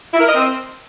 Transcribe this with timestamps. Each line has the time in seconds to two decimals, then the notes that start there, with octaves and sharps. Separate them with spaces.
0.13 E4
0.20 A#4
0.27 D#5
0.34 C4